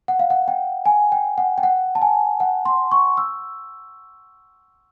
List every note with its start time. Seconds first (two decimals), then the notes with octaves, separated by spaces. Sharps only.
0.08 F#5
0.19 F5
0.30 F#5
0.48 G5
0.86 G#5
1.12 G5
1.38 F#5
1.58 G5
1.63 F#5
1.95 A5
2.02 G#5
2.40 F#5
2.66 C6
2.92 C#6
3.17 E6